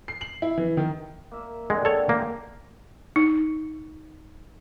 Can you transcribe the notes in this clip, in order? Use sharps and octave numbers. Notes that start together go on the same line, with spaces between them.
C7
F#7
E4
E3
D#3
A#3 E5
D3 G#3 C4 F#5
A4 C#5
G#3 A#3 G4
D#4